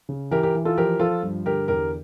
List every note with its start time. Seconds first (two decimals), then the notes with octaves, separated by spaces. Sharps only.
0.09 C#3
0.31 E3 G4 A#4
0.43 G4 A#4
0.55 E3
0.65 F4 A4
0.77 F3 G4 A#4
1.00 F3 F4 A4
1.23 G2
1.45 D3 G4 A#4
1.68 E2 G4 A#4